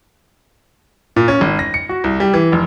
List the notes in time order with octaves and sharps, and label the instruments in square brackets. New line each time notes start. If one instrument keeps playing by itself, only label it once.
[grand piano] A#2
C#4
G#1
A#6
C#7
F#4
C2
G3
E3
F1